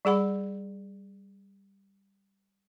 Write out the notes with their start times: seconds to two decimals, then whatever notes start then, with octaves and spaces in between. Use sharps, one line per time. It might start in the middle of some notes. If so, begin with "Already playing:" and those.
0.05 G3 G#4 F#5 B5